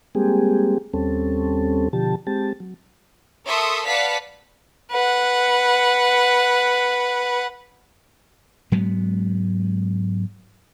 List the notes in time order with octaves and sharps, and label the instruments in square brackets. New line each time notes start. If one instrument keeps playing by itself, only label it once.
[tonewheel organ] G3 G#3 A#3 C4 G4 G#4
D#2 G3 C4 C#4 A4
B2 D3 F3 G4 A5
G#3 C4 G4 A5
F#3
[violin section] A4 A#4 E5 C6 C#6 D#6
B4 D5 F5 F#5 A5 B6
[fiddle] B4 F#5
[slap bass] G#2 F#3 G#3 B3